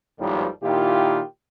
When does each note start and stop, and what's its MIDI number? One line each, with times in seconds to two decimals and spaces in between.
0.19 0.46 32
0.19 0.46 39
0.19 0.46 45
0.19 0.46 51
0.19 0.46 53
0.19 0.46 55
0.62 1.21 46
0.62 1.21 51
0.62 1.21 64
0.62 1.21 65
0.62 1.21 67